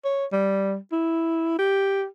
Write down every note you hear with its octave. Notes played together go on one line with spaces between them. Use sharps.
C#5
G3
E4
G4